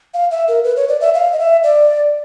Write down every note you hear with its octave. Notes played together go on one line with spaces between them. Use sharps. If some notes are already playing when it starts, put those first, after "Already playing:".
F5
E5
A#4
B4
C#5
D5
E5
F5
D#5
E5
D5